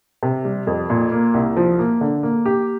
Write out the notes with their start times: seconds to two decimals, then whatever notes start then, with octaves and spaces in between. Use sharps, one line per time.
0.23 C3
0.45 G3
0.67 F2
0.90 A#2
1.12 A#3
1.34 C2
1.57 F3
1.79 A#3
2.01 D3
2.23 A#3
2.46 G4